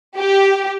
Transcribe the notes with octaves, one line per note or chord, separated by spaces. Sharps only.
G4